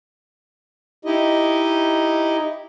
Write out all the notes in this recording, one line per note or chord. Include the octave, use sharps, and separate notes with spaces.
D#4 E4 G4 D#5